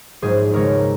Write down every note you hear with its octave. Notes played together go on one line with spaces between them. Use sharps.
A#1 G#2 F#3 G#4 C5
D#2 C#3 G#3 A#4 C#5